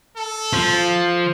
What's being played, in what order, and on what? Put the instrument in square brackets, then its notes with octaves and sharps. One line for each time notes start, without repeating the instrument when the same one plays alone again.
[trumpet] A4
[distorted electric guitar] F3